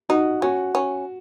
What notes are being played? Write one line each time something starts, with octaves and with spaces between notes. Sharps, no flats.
D#4 F#4
C#4 F#4
C#4